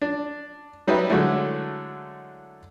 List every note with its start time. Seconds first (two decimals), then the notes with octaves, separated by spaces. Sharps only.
0.02 D4
0.87 F#3 G3 D#4 G4 B4 E5
1.10 D3 F#3 G#3 A3 E4